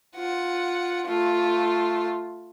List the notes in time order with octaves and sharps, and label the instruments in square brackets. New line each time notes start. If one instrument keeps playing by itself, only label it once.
[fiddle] F4 F#5
A3 F4